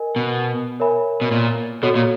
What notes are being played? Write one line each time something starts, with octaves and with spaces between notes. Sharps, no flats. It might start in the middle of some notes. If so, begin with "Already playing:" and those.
Already playing: A#4 D#5 G#5
B2
A#4 C#5 E5 G#5 B5
B2
A#2
B2 F#4 A4 C#5
A#2